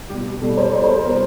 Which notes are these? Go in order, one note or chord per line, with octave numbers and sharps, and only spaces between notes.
B2 G3 G4
B2 G3 A4
C5
B2 G3 C5
C5
B4
B2 G3 A#4